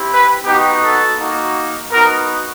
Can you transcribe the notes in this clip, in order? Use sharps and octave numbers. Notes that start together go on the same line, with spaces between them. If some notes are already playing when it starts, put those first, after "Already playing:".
Already playing: C4 E4 G4
B4
B3 D#4 F#4 G4
A4
A#3 D#4 F#4
B3 D#4 F#4 A#4